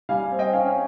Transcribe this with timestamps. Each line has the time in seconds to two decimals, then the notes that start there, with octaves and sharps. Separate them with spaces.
0.09 G3 F5 G#5
0.31 C4
0.39 D#5 G5
0.53 C#4 F5 G#5
0.67 G#5